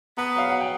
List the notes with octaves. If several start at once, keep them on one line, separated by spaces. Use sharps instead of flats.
B3 A#5
F#3 F5
F#5
G5